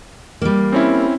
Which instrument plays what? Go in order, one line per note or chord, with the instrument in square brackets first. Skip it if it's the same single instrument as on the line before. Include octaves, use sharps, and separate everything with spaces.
[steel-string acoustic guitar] G3 A#3
[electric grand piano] C4 C#4 E4